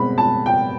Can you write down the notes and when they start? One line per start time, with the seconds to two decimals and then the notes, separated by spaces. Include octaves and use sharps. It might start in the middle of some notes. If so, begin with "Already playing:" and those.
Already playing: B2 G#3 C4 B5
0.18 A5
0.46 G5